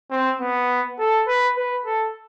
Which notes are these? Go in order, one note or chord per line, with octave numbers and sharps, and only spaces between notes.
C4
B3
A4
B4
B4
A4